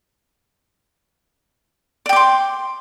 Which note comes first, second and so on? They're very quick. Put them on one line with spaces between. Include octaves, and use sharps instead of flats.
D5 G5 D6 C6